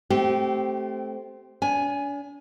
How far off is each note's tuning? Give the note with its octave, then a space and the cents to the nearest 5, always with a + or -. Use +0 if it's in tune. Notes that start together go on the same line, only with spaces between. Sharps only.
A3 -15 C4 +0 G4 -25
D4 -45 G#5 +0